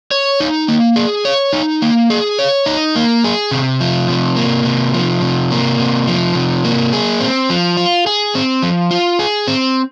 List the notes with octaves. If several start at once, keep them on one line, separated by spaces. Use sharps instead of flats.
C#5
D#4
A#3
G#4
C#5
D#4
A#3
G#4
C#5
D#4
A#3
G#4
C3
F3
C3
A#3
C3
F3
C3
A#3
C3
F3
C3
A#3
G#4
C4
F3
F4
G#4
C4
F3
F4
G#4
C4